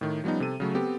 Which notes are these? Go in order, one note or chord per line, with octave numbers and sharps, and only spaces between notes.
A2 D#3
F3 G3 B3 C#4 D#4
C3 A4 D#7
C#3 F#3 A3
B3 C4 G4 A4